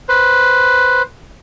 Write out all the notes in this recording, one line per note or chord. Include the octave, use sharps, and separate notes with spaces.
B4 C5